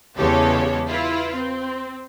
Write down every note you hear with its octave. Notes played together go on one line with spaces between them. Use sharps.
E2 C#3 G#3 G4 A4 C#5
E4 F4 B4
C4